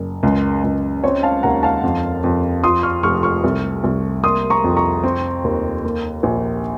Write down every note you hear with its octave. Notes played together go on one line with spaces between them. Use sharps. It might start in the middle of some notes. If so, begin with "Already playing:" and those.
Already playing: F#1
C#2
C#2
C4 C#5
F5 A5
D#2 F#5 A#5
F5 A5
F2
F2
F3 C6 D#6
C#6 F6
F1 C#6 F6
C#6 F6
C2
C2
A#3 C6 D#6
A#5 C#6
F2
A#5 C#6
C4
D#2
A#3
A#1